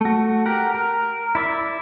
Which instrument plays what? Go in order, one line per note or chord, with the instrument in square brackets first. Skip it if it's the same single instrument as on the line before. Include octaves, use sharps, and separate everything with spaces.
[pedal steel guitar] A3 F#4
G4 A#4 F#5
A#4
E4 D5 E5